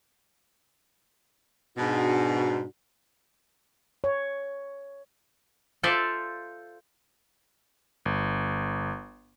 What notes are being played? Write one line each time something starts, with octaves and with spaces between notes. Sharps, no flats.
G#2 B2 D4 F#4
C#5
F4 A4 C5 D5 E5 F5
G1